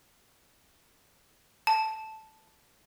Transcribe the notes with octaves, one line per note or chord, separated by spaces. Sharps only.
A5